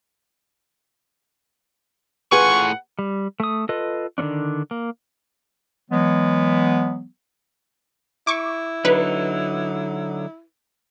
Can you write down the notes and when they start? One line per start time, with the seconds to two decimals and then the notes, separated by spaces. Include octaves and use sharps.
2.32 A2 F4 G#4 B4 F#5 G#5 C#6
2.99 G3
3.40 A3 D#6
3.69 F4 A4 B4 D#5
4.18 D3 D#3 G#3 C#4 D4
4.71 A#3
5.91 E3 F#3 G#3 B3
8.27 E4 C#6 D6
8.85 D3 F#3 D#4 B4